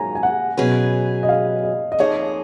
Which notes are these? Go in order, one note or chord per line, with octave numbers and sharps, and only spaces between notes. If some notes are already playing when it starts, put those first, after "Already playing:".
Already playing: G#2 D#3 F#3 C#4 F4 G#5 A#5
G#5
F#5
B2 F#3 C#4 G#4 B4
D#5
F5
D#5
D#5
F2 F3 A#3 D#4 G#4 C#5